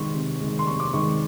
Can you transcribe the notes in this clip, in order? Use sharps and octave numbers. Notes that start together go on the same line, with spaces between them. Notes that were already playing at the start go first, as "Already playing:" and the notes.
Already playing: C3 D#3 G#3 C6 C#6
C3
D#3 G#3
C6
C3 C#6
D6
D#3 G#3 C#6